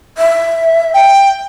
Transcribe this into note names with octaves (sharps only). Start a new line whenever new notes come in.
E5
G5